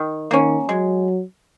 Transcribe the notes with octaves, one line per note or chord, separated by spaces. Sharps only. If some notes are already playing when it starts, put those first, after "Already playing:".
Already playing: D#3
D#3 A#3 C#4
F#3 G#3